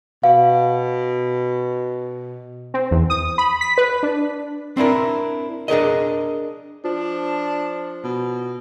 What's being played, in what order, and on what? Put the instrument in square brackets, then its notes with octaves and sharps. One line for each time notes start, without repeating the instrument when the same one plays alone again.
[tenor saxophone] B2 [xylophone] F5
[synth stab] C4
E2
D#6
B5
B6
B4
D4
[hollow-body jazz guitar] C4 D4 E4 A#4
D4 G#4 A#4 D#5
[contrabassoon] F3 [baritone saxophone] D4
[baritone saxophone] B2